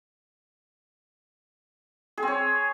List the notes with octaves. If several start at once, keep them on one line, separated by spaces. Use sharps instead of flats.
G#4
C4
C#5